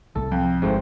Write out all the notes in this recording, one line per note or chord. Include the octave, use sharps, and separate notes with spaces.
C2 A2 A4
F2
G#1 G#2 A3 C5